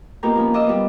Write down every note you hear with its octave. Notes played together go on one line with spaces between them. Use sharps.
A#3 B3 D#4 F4 G4 A#4
F3 A#3 C#4
F4 D#5 D6 E6
G3 B3